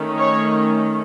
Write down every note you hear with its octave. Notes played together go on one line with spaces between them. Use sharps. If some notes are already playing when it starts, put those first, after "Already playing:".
Already playing: D#3 A3 C#4
C#5